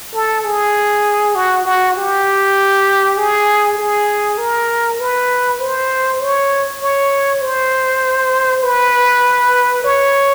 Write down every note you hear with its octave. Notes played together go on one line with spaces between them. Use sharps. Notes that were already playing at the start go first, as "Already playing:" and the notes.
A4
G#4
F#4
F#4
G4
G#4
G#4
A#4
B4
C5
C#5
C#5
C5
B4
C#5